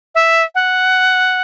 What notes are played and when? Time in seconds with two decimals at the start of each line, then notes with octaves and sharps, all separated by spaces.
0.15 E5
0.55 F#5